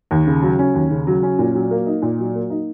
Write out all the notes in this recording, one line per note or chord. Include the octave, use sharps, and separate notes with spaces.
D#2
C#3
F#3
C#4
D#2
C#3
F#3
C#4
A#2
F#3
A#3
D#4
A#2
F#3
A#3
D#4